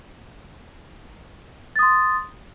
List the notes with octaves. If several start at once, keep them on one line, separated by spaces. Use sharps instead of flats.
C6 D#6 A6